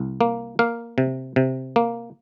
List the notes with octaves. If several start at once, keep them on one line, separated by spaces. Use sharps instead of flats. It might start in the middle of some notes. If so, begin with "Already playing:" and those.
Already playing: C2
A#3
A#3 F5
C3
C3
A#3